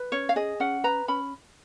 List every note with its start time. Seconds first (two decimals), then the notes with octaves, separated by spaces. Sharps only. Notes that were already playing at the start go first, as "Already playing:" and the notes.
Already playing: B4
0.12 C#4 C#5
0.29 F5
0.36 G#4 D#5
0.60 C#4 F#5
0.84 B4 A#5
1.08 C#4 B5